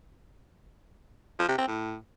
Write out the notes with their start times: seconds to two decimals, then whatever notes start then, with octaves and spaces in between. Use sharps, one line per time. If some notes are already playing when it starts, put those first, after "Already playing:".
1.39 F3
1.49 C3
1.58 C4
1.68 A2